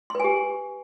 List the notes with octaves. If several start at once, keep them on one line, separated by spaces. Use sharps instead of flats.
G4 B4 G#5 C6